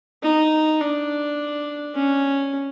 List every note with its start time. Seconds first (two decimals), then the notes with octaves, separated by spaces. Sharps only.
0.23 D#4
0.81 D4
1.95 C#4